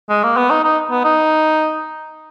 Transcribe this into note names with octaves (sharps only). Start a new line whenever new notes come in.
G#3
A#3
B3
D#4
D#4
B3
D#4